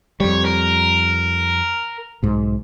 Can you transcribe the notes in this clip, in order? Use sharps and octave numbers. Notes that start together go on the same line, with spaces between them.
F2 G3 C#5
A#4
B1 G#2